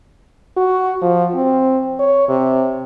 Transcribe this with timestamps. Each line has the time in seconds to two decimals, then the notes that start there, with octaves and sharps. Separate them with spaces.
0.57 F#4
1.02 F3
1.34 C4
1.99 C#5
2.28 C3